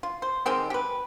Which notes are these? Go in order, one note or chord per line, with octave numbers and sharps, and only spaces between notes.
F4
C5
D#3 G#3 C4 G4
G4 B4